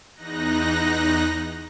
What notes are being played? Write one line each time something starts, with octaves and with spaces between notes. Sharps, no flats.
E2 D#4 F#6 A#6